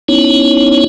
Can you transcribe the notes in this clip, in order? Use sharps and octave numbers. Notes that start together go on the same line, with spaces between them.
B3 C#4 D#4 E4 C#5